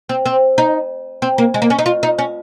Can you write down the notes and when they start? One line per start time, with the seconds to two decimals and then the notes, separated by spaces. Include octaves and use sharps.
0.09 C4
0.26 C4
0.58 D#4
1.22 C4
1.38 A#3
1.54 G#3
1.62 A#3
1.70 C#4
1.79 D#4
1.86 F4
2.03 D#4
2.19 C#4